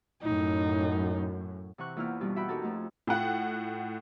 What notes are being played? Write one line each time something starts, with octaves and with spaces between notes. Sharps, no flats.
F#2 A2 D#4
C3 E3 F#5 C#6 F#6
E2 A#3 E4 F4 G5 F6
G2 B2 G3
F#4 E5 F#5 G5 B5
C#4 D#4 F#4 G4 A4 A#4
F2 A3 F4
A2 F4 F#5 G5 F#6